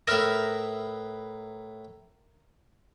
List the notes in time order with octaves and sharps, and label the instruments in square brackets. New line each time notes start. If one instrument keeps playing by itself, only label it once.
[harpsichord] A2 B4 D#6 [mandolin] A#4 E5 F6